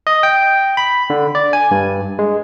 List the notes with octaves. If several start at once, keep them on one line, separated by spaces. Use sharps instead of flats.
D#5
G5
B5
D3
D5
G#5
G2
G#3